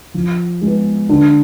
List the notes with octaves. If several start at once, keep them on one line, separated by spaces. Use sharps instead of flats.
F3
G#3 B3
D3